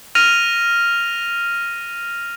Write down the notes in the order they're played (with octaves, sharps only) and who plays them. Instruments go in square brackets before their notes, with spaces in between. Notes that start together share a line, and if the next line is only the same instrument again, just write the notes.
[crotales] F6 A#6 D#7 F7